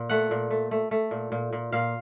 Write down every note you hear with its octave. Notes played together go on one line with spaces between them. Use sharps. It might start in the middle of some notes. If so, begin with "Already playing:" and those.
Already playing: A#2
A3 F#5
A#2
A3
A3
A3
A#2
A#2
A#2
A#2 F5